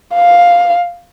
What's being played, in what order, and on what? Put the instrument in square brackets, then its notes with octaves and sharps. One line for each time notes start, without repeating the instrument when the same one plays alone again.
[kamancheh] F5